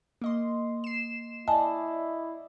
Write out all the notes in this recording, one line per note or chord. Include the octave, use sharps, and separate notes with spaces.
A#3 D#5 C6
C7 E7
E4 D5 D#5 G#5 A5